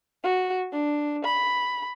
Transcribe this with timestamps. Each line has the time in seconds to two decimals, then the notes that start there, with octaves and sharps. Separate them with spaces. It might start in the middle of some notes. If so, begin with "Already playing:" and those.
0.23 F#4
0.72 D4
1.25 B5